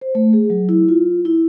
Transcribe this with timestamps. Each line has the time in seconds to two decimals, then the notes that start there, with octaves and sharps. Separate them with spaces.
0.01 C5
0.15 A3
0.33 G#4
0.50 F#3
0.69 E4
0.89 F4
1.25 E4